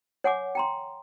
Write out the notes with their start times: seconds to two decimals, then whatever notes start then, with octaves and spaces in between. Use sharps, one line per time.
0.24 C#5 F#5 G#5 D6
0.55 G5 A#5 C6